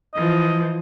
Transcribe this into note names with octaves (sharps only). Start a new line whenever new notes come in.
E3 F3 D#5